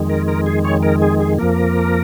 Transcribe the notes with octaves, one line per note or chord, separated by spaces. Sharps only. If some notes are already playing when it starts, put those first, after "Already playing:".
Already playing: F2 D#3 G#3
A#4
A#4
G#4
C#5
A#4
G#4
G#4
F2 F3 A#3 A#4